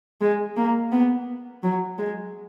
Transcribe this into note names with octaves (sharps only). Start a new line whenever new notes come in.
G#3
A#3
B3
F#3
G#3